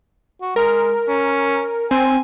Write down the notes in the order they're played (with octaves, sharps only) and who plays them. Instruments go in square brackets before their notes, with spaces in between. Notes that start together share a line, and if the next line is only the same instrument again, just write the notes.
[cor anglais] F#4
[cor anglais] G#3 [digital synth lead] A#4
[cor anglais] C#4
[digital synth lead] C4 [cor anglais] G#5